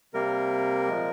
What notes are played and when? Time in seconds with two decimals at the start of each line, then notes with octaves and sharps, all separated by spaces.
0.14 C3 G3 A#3 A#4
0.88 A#2 F3 G#3